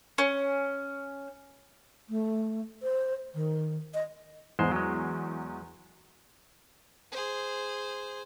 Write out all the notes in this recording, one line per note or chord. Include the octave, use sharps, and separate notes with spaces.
C#4
A3
C5
D#3
D#5
E2 G#2 G#3 C5
F#3 G#3
G#4 C5